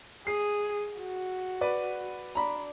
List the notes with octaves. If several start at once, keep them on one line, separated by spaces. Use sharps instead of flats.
G#4 C7
F#4
B4 D5
D4 A#5 B5